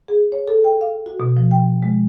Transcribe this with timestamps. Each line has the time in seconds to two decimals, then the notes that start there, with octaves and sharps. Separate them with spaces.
0.08 G#4
0.32 C#5
0.48 A4
0.64 G5
0.81 F5
1.06 F#4
1.20 B2
1.37 F3
1.51 G5
1.83 G#3